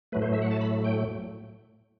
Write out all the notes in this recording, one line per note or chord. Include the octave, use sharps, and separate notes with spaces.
A2 F#3 A3 B4
C5
E5
F#5
A5
B5
G5